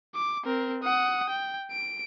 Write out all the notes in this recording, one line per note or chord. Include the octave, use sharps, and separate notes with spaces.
D6
C4 A#4
F#5 D#6
G5
D7